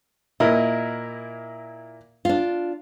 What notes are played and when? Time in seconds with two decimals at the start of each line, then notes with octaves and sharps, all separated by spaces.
0.40 A#2 E4 A#4 D#5
2.25 D4 F4